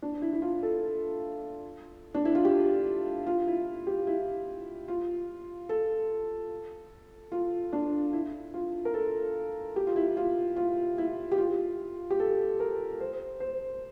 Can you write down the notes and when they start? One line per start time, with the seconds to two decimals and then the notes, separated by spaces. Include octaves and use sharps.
0.02 D4
0.22 E4
0.33 E4
0.42 F4
0.63 A4
2.14 D4
2.25 E4
2.35 F4
2.45 G4
3.27 F4
3.47 E4
3.87 G4
4.07 E4
4.88 F4
5.69 A4
7.32 F4
7.73 D4
8.13 E4
8.54 F4
8.85 A#4
8.94 A4
9.76 G4
9.87 F4
9.96 E4
10.17 F4
10.56 F4
10.98 E4
11.32 G4
11.38 F4
12.10 G4
12.20 A4
12.60 A#4
13.00 C5
13.40 C5